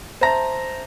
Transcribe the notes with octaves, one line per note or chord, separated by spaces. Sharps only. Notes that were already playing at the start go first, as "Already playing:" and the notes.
C5 E5 A5 A#5 A#6